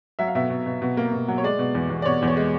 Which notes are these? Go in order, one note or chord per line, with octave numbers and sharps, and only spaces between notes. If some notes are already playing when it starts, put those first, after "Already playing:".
F#3 E5
F5
B2 E5
B2
B2
B2
A#3
B2
F#3
C#5
G#3 D5
B2
E2
E2
D5
B2 C#5
E2
C#5
G#3